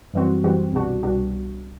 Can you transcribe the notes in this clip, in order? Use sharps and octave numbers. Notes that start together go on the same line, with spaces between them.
F#2 E3 G3 C4 F#4
F#2 E3 G3 C4 F#4
C2 B2 G3 D4 F#4
C2 B2 G3 D4 F#4